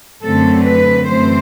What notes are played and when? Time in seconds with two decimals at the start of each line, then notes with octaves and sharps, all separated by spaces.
0.23 F#2 D3 A3 C4 A4
0.65 B4
1.07 F#2 E3 A3 C4 C5